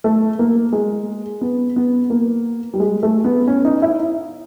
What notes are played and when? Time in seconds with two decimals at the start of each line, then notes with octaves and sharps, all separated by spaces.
0.04 A3
0.39 A#3
0.72 G#3
1.41 B3
1.76 B3
2.10 A#3
2.74 G3
2.80 G#3
3.03 A3
3.24 B3
3.48 C#4
3.65 D#4
3.82 E4